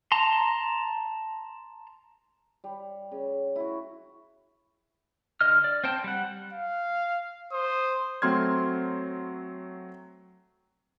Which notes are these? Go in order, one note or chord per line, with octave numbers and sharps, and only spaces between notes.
A5 A#5 C6
G3
C#3
E4 F#4
D3 D#5 F6
D5
C4 C5 G5 A5
G3 F#5
F5
C5 D#6
F#3 A3 C4 C6 F6 G#6